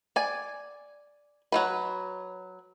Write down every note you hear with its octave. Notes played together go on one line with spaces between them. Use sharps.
D5 G#5
F#3 A3 B4